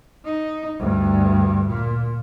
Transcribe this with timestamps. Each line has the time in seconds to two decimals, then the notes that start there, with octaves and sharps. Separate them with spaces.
0.25 D#4
0.79 D2 G2
1.68 A#2